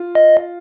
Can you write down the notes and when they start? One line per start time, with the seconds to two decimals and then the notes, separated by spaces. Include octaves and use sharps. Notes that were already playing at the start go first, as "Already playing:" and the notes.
Already playing: F4
0.15 D#5